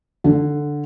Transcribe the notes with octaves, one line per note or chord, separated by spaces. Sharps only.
D3